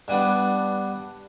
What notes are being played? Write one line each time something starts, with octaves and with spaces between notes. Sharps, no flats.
G2 G3 B3 D4